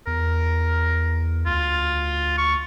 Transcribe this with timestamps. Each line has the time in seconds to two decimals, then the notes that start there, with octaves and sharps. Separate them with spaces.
0.07 E2 A#4
1.46 D2 F4
2.38 C#6